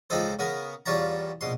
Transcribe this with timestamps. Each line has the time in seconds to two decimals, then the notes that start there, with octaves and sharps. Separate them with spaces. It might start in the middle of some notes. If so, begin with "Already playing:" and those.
0.10 C#2 F3 C4 D#4 A4 C5
0.39 C#3 B3 A#4
0.86 E2 G3 F4 C#5 A5 A#5
1.41 A#1 B2 C6